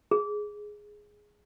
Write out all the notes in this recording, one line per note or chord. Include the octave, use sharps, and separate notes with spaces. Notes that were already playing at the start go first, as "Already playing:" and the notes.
G#4